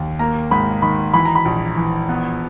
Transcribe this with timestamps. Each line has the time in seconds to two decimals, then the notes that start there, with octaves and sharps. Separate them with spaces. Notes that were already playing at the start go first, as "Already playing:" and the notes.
Already playing: D#2
0.19 A#3 A#5
0.51 G#2 B5
0.82 D#3 B5
1.14 E3 B5
1.25 A#5
1.35 B5
1.45 A#1
1.77 E3
2.09 B3